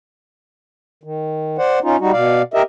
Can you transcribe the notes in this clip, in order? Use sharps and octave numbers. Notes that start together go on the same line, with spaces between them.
D#3
C5 D5 F#5
C#4 D#4 F4
G3 D#4 F#4
B2 D5 F5
G4 A#4 D#5 E5